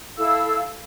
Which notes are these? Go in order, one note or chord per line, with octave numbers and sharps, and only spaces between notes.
E4 A4 F5 E6